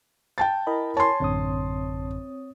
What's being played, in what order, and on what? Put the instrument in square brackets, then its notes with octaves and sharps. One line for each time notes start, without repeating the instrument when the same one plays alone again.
[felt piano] G5 A5 A6
[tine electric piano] E4 A#4 B5 [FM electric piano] D#5 A#5
[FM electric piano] C#5 G#5 [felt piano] A5 C6
[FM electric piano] A1 F#2 D3 [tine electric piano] C4 C#5 D#6